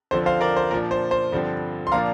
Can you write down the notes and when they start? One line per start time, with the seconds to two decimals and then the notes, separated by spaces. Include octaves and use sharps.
0.11 F2 D3 F3 C4 C5
0.26 C5 F5
0.41 A#4 D5
0.56 C5
0.71 A#2 F3 D4 A#4
0.91 C5
1.11 C5
1.32 G2 D3 F3 C4
1.87 C6
1.92 A#2 F3 A#3 D4 F5 A#5